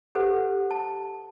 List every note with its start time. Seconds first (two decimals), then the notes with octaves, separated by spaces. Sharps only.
0.15 G4 A4 B4 C5 F#5
0.71 A5